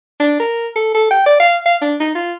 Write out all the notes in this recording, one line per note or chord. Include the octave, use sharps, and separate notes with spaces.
D4
A#4
A4
A4
G5
D5
F5
F5
D4
D#4
F4